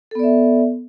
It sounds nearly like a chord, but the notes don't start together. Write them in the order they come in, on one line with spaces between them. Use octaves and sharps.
A4 B3 D5 E5